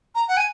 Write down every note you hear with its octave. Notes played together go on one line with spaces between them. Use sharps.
A#5
F#5
G#5